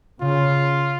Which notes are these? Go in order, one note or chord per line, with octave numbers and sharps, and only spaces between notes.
C#3 F4